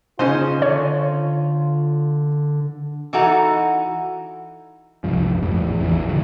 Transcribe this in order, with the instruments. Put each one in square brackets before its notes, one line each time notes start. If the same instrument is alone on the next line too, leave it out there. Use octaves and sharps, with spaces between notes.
[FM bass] C#3 [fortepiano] C#4 D#4 C5 [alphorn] F4
[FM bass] D3 [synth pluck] C#5
[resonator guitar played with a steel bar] E3 D#4 F#4 A4 F#5 A#5
[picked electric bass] F1 C2 G2 F3
G#1 F2 A2
E2
A1 E2 E3
B2 D3 E3 F3